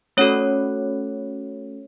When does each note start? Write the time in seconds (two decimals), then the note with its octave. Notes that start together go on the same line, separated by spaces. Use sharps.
0.17 A3 C#4 F#4 A4 C#5